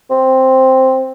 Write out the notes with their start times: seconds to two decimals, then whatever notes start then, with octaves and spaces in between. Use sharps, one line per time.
0.10 C4